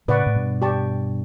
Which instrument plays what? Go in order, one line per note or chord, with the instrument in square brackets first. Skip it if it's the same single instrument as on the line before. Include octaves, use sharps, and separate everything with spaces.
[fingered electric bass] A2 C#3 [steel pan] B4 D5 F#5 C#6
[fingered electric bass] A2
G2 B2
[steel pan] G4 D5 A5 C#6